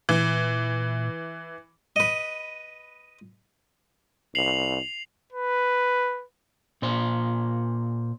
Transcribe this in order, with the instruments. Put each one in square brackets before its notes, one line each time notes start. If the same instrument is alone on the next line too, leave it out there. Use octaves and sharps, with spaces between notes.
[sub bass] A#2 [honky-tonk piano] E3
[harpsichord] B4 D#5
[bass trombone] C2 [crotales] C7 F7 F#7
[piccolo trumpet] B4
[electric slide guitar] A#2 C5